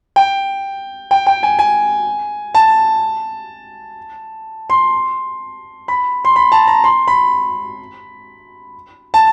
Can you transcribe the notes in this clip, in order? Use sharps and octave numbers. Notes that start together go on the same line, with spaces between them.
G5
G5
G5
G#5
G#5
A5
C6
B5
C6
B5
A5
A#5
C6
B5
A5